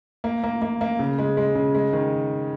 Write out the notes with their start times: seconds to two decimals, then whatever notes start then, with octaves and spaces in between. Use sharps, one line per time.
0.24 A#3
0.44 A#3
0.62 A#3
0.81 A#3
0.99 C#3
1.19 G#3
1.37 G#3
1.55 C#3
1.75 G#3
1.93 D#3